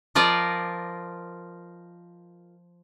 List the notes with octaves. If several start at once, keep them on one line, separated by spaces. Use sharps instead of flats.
F3 F4 A#4 D5 D#5